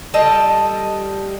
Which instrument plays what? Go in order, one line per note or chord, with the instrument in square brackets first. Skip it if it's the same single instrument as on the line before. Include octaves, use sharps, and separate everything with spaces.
[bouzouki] G3 A4 D#5 A5